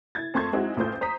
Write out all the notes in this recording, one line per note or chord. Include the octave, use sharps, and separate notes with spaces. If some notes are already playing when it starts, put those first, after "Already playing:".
E4 G#6 A6
F2 A3 A5 C6 C#6 G#6
G#3 C4 D#4 E4 F#4
A1 A3 F4 C5 G6
C5 A#5 D#6 B6